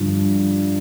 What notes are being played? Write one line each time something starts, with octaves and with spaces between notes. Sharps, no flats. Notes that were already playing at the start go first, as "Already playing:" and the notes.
Already playing: G2 D3 F3